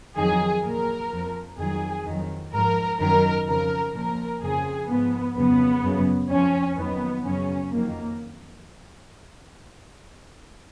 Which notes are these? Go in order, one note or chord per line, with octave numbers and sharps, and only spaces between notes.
F2 D#3 F#3 G#4
A#2 F#3 A#4
F2 F3
F2 D#3 F#3 G#4
F2 D#3 F#3
G#2 F3 A#4
F#2 D#3 F#3 A#4
F2 C#3 F3 A#4
A#2 F3 A#4
F2 C#3 F3 G#4
G#2 F3 B3
F2 C#3 F#3 B3
F#2 C#3 F#3
F2 F3 C#4
F2 D#3 F#3 B3
F#2 C#3 F#3 C#4
F2 D#3 F#3 A#3